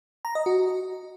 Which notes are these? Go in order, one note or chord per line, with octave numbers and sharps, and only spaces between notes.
A#5
D#5
F#4